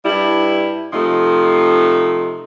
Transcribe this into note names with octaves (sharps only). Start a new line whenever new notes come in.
G2 G3 E4
C3 F3 A3 D#4